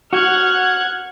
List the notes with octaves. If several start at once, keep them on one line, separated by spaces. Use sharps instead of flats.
F#4 F#5 F6 F#6 G#6